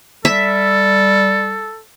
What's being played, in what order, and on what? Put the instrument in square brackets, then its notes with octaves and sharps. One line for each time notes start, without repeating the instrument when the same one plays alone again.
[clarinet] G3 [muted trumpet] A4 [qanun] E5